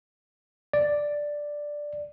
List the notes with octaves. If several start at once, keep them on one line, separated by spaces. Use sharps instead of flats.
D5